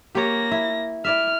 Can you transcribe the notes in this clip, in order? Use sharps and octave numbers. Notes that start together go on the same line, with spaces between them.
A#3 G4 C#5 A#6
E4
E4 D5 E5 F6